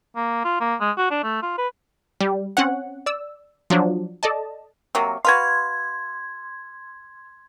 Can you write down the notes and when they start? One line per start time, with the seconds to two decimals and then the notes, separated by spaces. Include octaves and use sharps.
0.16 A#3
0.44 F4
0.60 A#3
0.80 G#3
0.97 F#4
1.11 D4
1.23 A3
1.42 F4
1.58 B4
2.21 G3
2.57 C4 C#4 C#5 F#5
3.06 D5 E6
3.70 F3 F#3 D4
4.23 A4 D5 D#5 A5
4.95 C3 F#3 A#3
5.25 F#4 B4 F5 C6 G#6